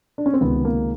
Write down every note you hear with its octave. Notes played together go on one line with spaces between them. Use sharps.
D4
C#4
C4
C#2 C3 D#3 B3
A#3